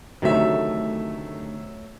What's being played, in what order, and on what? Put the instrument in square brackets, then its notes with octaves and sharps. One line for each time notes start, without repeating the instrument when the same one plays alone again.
[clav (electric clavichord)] D2 C3 D#3 [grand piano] F#3 A3 E5